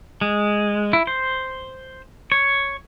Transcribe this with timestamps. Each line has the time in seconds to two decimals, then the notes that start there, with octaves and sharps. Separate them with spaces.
0.21 G#3
0.93 E4
1.07 C5
2.32 C#5